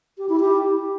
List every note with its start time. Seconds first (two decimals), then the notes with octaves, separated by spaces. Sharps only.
0.18 G4
0.29 E4
0.40 G4